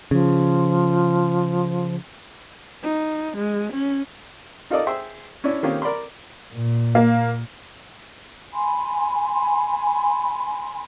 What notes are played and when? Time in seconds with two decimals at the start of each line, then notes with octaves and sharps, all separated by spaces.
0.11 C#3 F3
2.83 D#4
3.37 G#3
3.73 C#4
4.70 D#4 F4 A4 A#4 D5 D#5
4.87 G#4 C5 E5 G5
5.44 C#4 D4 E4
5.63 D#3 A#3 C4 C#4 F4 G4
5.82 A#4 D5 B5 C6
6.53 A#2
6.95 A#3
8.53 G#5 B5 C6